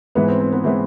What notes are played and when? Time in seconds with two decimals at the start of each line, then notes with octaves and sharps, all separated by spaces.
0.15 G#2 E3 G#3 B3
0.29 C4
0.40 C4
0.52 B3
0.64 E3 G#3 B3 C4